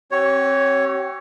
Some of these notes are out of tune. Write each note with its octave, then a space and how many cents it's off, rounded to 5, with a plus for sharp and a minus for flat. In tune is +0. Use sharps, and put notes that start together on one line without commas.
C4 +30 G4 -45 C#5 +0